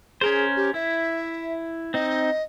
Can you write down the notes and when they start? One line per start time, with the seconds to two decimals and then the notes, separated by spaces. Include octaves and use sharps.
0.21 C#4 G#4 A#4 C5
0.56 G4
0.74 E4 E5
1.94 C4 D#4 D#5